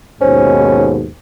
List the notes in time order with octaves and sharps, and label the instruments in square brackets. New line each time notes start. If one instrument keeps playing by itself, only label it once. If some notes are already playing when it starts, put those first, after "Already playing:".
[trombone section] D#2 G#2 B2 [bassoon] C#4 [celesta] C5